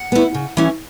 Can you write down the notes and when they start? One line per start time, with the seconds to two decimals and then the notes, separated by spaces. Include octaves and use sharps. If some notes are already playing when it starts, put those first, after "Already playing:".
Already playing: F#5
0.12 B3 E4
0.34 C#3
0.57 E3 C#4 E4